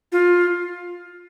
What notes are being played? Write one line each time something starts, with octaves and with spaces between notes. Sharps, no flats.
F4